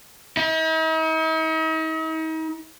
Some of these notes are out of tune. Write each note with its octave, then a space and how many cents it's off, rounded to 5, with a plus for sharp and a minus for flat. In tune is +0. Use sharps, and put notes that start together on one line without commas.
D#4 +45